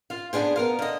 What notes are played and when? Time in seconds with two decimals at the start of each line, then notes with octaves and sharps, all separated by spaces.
0.10 F4 F5
0.33 D3 B3 D4 G#4 C5
0.56 B3 A#4 F5
0.79 D3 D#5